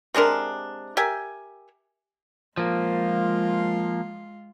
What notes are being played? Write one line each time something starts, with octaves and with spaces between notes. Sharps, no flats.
C3 G#3 D4 A#4
G4 A#4 E5 G#5
F3 G#3 A#3 F4